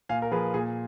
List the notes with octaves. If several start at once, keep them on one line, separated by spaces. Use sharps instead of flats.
A#2 F5 G#5
A#4
F3 G#4 B4
A#2 G#4